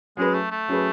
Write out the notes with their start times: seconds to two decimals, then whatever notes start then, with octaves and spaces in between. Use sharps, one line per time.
0.17 F#3 G#3 C#4 G#4 B4
0.34 A3
0.51 A3
0.68 F#3 C#4 G#4 B4